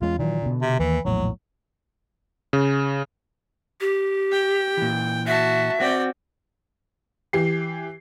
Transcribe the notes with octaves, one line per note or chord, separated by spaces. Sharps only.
E2 G#3 C#4 F4
A#2 D#3 E3 F#3
B2 D3
C3
D#2 E3 A#3
A#1 E2 A2 F#3
C#3
G4
G5
A#2 E3
F#4 E5 A5
C4 F#4 D5 G5
E3 G4 C7